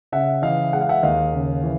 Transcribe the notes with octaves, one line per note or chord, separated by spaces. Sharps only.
C#3 E5 F#5
E3 D#5 F5
G#3 F#5
F5
E5 F#5
D#2 D#5 F5
C#3
E3